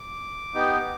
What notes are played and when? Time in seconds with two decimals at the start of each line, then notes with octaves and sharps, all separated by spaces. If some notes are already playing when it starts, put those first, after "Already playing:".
Already playing: D6
0.55 B3 D#4 G4